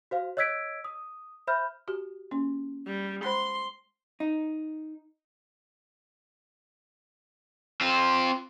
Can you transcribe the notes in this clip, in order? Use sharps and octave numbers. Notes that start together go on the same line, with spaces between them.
F#4 C5 F5
C#5 D#5 E6 G#6 B6 D7
D#6
C5 E5 B5 F6 G6
F#4 G4
A#3 C#4
G3
G#3 C5 B5 C6
D#4
C4 F4